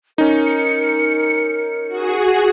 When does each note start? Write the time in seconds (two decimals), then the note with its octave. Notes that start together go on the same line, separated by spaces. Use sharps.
0.18 C#4 D#4 A#4 C#7
1.88 F#4 G#4